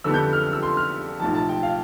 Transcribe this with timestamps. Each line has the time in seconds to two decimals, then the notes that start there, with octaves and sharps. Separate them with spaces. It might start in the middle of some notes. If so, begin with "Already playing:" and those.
0.04 F2 D3 G3 B3 E6
0.14 G6
0.33 F6
0.44 F6
0.53 E6
0.63 C6
0.77 F6
1.20 B1 A2 F3 A5
1.34 A5
1.49 G5
1.63 F5